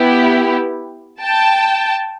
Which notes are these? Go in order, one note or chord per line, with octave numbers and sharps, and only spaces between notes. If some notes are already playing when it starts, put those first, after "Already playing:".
Already playing: B3 E4 G4
G5 A5